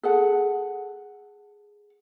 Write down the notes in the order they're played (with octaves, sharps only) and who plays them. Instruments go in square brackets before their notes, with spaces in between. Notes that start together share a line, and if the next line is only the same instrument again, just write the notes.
[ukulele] G#4 A4 F#5